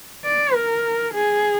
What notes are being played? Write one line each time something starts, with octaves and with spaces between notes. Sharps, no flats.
D5
A#4
G#4